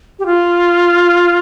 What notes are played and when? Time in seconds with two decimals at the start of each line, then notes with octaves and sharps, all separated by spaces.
0.19 G4
0.26 F4